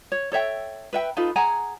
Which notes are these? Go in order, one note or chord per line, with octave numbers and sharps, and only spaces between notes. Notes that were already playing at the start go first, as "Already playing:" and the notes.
C#5
A4 C#5 E5 G5
B4 E5 G5
D#4 F4 A4 B4
G#4 F#5 G#5 A#5